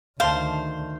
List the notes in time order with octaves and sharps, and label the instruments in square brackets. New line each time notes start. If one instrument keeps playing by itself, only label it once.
[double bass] D2 D#3 [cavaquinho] C5 [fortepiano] F5 A5